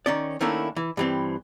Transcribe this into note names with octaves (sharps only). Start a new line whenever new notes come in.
D#3 C#4 D5
D#3 A3 A#3 C#4 D4 E4
E3
G2 E3 C4